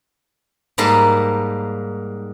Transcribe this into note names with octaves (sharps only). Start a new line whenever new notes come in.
G#2 G3 A#3 D#5 A5 B5